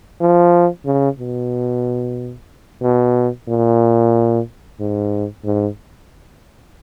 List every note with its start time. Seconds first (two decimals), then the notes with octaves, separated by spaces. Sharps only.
0.21 F3
0.86 C#3
1.19 B2
2.82 B2
3.48 A#2
4.80 G#2
5.44 G#2